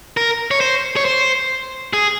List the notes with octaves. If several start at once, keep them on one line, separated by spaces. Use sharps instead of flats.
A#4
C#5
C5
C#5
C5
G#4